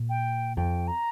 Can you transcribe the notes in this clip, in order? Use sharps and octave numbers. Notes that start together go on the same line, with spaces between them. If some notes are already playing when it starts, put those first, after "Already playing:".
Already playing: A#2
G5
F2 G5
A#5